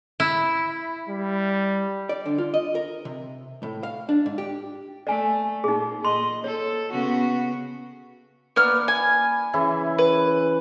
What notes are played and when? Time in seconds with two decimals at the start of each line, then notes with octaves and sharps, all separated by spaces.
0.20 E4
1.09 G3
2.09 D5
2.26 D3
2.38 F4
2.54 D#5
2.75 A#4
3.05 C3
3.63 A2
3.83 F5
4.09 D4
4.26 G#2
4.38 G4
5.07 A3 D5 G#5
5.64 A#2 D#4 G#4
6.05 A#2 D#5 C6
6.44 A4 C#5
6.91 C#3 B3 F#4
8.56 A#3 B3 D5 F6
8.88 G#5 B5
9.53 C#3 E3 E4
9.98 B4